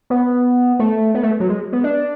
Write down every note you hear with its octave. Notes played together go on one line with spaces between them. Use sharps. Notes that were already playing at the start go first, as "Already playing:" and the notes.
B3
A3
B3
A3
F#3
G#3
B3
D4